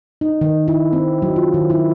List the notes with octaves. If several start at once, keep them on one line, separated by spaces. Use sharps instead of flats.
D#4
D#3
E4
C4
F#3
F4
D#3
E4